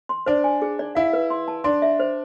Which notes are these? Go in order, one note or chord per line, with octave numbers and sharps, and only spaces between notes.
C6
D4 C5
G#5
G#4
D5
E4 F5
B4
C6
A5
D4 C6
E5
C5